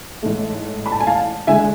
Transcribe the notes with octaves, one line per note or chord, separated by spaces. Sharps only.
A1 G#2 E3 A3
B5
A5
G#5
F5 A5
E2 D3 G#3 E5 G#5